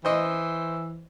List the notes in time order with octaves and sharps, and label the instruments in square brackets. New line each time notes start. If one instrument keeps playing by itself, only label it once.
[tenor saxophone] E3 [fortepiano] C5 D#5